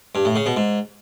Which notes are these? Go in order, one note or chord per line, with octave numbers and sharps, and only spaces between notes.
G2
A2
C#3
B2
G#2